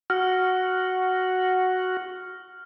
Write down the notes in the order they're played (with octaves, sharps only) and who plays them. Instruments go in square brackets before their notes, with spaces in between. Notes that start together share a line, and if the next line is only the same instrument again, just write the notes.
[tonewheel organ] F#4 [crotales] F6